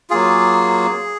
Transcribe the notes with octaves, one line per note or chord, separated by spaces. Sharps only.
F#3 A#3 F4 G#4